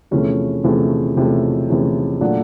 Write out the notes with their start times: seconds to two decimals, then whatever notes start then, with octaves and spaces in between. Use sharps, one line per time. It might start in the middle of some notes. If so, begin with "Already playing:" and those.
0.11 E2 C3 F3 A3 C#4
0.64 E2 C3 F3 A3 C#4
1.16 E2 C3 F3 A3 C#4
1.69 E2 C3 F3 A3 C#4
2.21 A#2 F#3 A3 D4 F#4